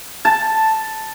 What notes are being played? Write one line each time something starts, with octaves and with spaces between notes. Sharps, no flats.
A5